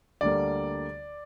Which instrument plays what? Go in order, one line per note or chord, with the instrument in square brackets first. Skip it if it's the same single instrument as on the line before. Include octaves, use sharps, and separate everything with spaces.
[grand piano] D2 D3 G3 A#3 D5